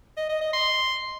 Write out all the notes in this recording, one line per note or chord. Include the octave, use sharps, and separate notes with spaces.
D#5
D#5
D#5
C6